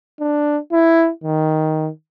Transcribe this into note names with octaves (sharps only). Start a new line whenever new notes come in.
D4
E4
D#3